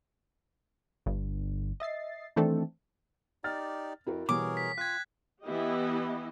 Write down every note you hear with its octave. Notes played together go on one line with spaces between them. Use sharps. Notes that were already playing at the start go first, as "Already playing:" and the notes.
G1 G2
D#5 E5 A6 C7
D#3 E3 A3 C4 D4 A4
D#4 G4 D5 F6 A6
F2 E4 F#4 A#4
B2 E3 G3 G#4 A#4 C#5 D6
B6
F4 F5 G5 F#6 G#6
E3 B3 E4 G4 D#5